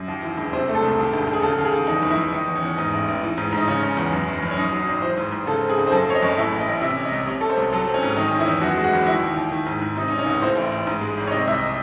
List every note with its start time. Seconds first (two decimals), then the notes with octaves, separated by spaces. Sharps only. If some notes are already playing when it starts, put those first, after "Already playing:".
Already playing: F#2
0.08 D#2
0.23 E3
0.37 E1
0.53 C3 C5
0.68 A3
0.75 A4
0.83 C2
0.98 D#2
1.13 E1
1.27 E1
1.33 G#4
1.42 C#3 A4
1.58 D#2
1.65 G#4
1.73 D#2
1.87 E2 D#4
2.02 F#1
2.10 E4
2.17 F#1
2.32 D#3 D#4
2.48 E2
2.55 C#4
2.63 E2
2.77 G#2 D#4
2.93 A1
3.08 A1
3.23 E3
3.38 G#2
3.52 G#2
3.58 D#4
3.68 C#3 C#4
3.83 C#4
3.97 E2
4.12 F#2
4.28 F#1
4.43 F#1
4.51 C#4
4.57 F#2 D#4
4.72 F#3
4.80 D#4
4.87 G#1
5.02 E3 C5
5.17 G#2
5.32 G#2
5.47 C#3 A4
5.62 C4
5.69 G#4
5.78 C#2
5.87 C5
5.92 F#2 A4
6.07 C4 C#5
6.15 D#5
6.22 F#1
6.38 A2 E5
6.52 A1
6.60 D#5
6.68 A1
6.82 C3 E5
6.97 C#4
7.05 D#5
7.12 C2
7.26 C3 C#5
7.41 C#4 A4
7.50 C5
7.57 C2
7.73 F#3 A4
7.87 C4
7.94 C#4
8.03 G#2
8.17 D#3 D#4
8.31 C#4
8.39 E4
8.47 E2
8.61 F#2 F#4
8.77 G#3
8.84 F#4
8.93 F#1
9.07 D#3 E4
9.22 D#2
9.37 D#2
9.52 D#3
9.66 G#2
9.82 G#2
9.97 C3 D#4
10.08 C#4 D#4
10.19 C#4
10.26 C#2
10.41 A2 C5
10.57 A1
10.72 A1
10.87 G#2
11.01 G#3
11.17 G#1
11.27 C#5
11.31 C3 D#5
11.47 C2 E5
11.54 D#5